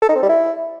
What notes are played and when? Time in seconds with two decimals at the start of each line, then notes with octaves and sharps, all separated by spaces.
0.02 A4
0.09 D#4
0.16 C4
0.22 G3
0.29 E4